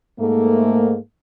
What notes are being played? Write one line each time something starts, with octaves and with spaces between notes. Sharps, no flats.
G#2 A3 A#3